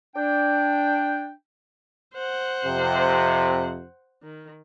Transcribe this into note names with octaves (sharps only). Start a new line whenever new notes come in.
D4 G5
C5 F#5
F2 C3
D#3